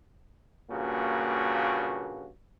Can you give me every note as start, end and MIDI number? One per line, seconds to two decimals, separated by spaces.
0.70 2.28 43
0.70 2.28 46
0.70 2.28 49
0.70 2.28 58
0.70 2.28 66